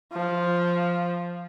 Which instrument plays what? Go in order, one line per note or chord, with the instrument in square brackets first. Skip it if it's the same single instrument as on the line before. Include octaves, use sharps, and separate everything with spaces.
[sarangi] F3